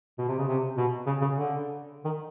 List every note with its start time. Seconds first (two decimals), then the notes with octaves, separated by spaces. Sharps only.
0.19 B2
0.28 C3
0.38 C#3
0.48 C3
0.77 B2
1.07 C#3
1.21 C#3
1.36 D3
2.05 D#3